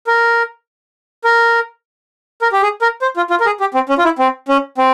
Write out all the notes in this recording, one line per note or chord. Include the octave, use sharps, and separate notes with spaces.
A#4
A#4
A#4
G4
G#4
A#4
C5
F4
F4
A#4
G#4
G4
C4
C#4
F4
E4
C4
C#4
C4